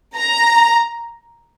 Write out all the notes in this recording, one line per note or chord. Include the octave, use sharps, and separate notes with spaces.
A#5